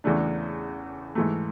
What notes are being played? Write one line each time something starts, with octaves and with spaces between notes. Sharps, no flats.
E2 C#3 E3 A3 D4
G#2 E3 A3